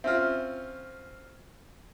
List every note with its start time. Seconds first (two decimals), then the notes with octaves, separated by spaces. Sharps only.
0.04 C4 C#4 F4 E5